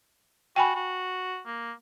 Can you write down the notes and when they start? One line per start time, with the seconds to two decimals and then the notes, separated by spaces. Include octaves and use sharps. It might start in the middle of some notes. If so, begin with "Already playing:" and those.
0.56 F#4 G5 G#5 B5
0.76 F#4
1.46 A#3